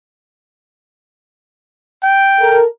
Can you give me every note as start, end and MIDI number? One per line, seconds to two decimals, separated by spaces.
2.03 2.60 79
2.40 2.65 69
2.40 2.65 70